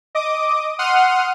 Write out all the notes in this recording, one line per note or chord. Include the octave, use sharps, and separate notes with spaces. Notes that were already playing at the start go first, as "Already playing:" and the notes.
D#5 D6 D#6
F#5 C6 D#6 F6 D#7